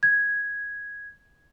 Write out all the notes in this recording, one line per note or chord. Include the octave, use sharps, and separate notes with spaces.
G#6